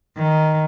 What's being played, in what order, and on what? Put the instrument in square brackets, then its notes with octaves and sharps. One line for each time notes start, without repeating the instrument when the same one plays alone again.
[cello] D#3